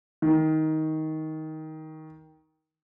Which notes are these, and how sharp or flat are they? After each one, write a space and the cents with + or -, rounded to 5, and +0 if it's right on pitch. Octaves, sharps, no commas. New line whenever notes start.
D#3 +15